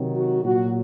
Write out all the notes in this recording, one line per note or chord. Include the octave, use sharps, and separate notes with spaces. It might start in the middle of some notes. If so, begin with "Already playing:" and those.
Already playing: C3 D#3 F#3
F#4
A#2 F#3 F#4